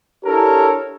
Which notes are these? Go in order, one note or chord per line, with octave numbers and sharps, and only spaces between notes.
D4 E4 G4 A4 A#4 C#5